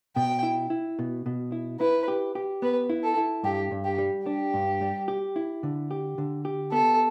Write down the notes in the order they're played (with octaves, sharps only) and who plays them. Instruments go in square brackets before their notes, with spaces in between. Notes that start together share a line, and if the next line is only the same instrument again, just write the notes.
[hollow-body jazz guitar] B2 [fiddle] G5
[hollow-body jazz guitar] E4
E4
B2
B2
E4
[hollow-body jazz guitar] E4 [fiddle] B4
[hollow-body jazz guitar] G4
G4
[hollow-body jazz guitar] B3 [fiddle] B4
[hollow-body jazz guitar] E4
[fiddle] A4
[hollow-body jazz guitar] E4
[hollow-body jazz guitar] G2 [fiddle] G4
[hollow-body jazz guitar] G2
[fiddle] G4
[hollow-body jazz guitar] G3
[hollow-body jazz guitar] D4 [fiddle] G4
[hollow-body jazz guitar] G2
G3
G4
E4
D3
G4
D3
G4
[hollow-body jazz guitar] B3 [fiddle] A4